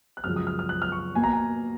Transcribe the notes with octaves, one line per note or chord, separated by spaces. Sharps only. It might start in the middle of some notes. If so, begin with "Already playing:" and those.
F#6
F#2 C#3 F3 G#3 F6
D#6
F6
F6
F#6
F6
C#6
B2 A#3 G#5
A#5
G#5